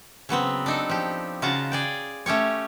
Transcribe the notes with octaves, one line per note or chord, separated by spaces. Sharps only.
C#3 F#3 B3 C4
D4 D#4 A4
F3 G4
C#3 F4 F#4 A5 A#5
G#4 D5 G5
A3 C#4 G4 C#5